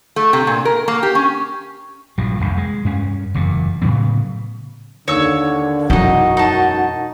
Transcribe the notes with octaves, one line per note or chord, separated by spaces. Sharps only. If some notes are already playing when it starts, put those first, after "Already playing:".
A3
C3
A#2
A#4
A#3
G4
C#4
A#1 G2 F3 F#3
D#1 C2 F2
G#3
G2 C#4
F#1 E2 A#2
A2 C#3 F#3 B3
D#2 D3 C#5 E6
E1 B1 F#2 D#4 E4 F#4 D#5
D#4 A5